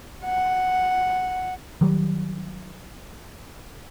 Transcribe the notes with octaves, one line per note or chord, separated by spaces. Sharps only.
F#5
D#3 F#3 G3